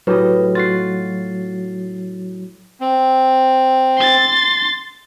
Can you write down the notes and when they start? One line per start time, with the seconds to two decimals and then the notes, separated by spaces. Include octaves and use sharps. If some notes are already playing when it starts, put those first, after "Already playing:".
0.07 A2 F#3 G4 B4 D#5
0.55 F4 F#4 A6 C7
2.81 C4
3.98 C6 A6